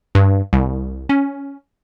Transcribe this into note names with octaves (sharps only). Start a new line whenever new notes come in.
G2
C2
C#4